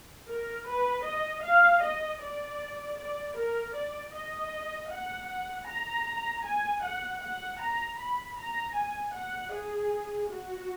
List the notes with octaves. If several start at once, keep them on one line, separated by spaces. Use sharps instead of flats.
A#4
B4
D#5
F5
D#5
D5
D5
A#4
D5
D#5
F#5
A#5
G#5
F#5
F#5
A#5
B5
A#5
G#5
F#5
G#4
F#4